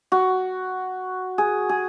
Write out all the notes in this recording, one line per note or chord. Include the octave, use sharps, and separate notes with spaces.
F#4
G#4
G#4